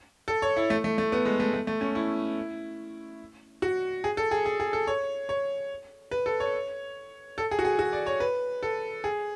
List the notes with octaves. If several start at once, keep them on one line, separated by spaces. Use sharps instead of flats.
A4
C#5
E4
A3
A3
A3
B3
G#3
A3
A3
A3
C#4
E4
F#4
G#4
A4
G#4
G#4
G#4
A4
C#5
C#5
B4
A4
C#5
A4
G#4
F#4
G#4
F#4
D5
C#5
B4
A4
G#4